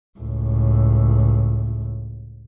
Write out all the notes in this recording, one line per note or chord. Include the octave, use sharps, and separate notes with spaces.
C#2 A2